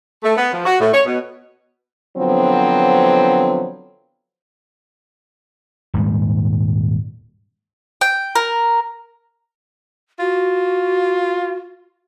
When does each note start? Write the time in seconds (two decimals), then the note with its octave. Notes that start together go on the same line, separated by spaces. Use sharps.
0.24 A3
0.36 B3
0.53 F3
0.66 F#4
0.80 A2
0.93 C#5
1.06 B2
2.17 D3 F3 F#3 B3 C4
5.94 D#1 G#2 G3
8.01 G5
8.35 A#4
10.19 F4 F#4